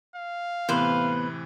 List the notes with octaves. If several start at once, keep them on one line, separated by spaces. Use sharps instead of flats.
F5
A2 C3 E3 B3 B4 C5